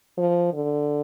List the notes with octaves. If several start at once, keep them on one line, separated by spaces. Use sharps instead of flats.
F3
D3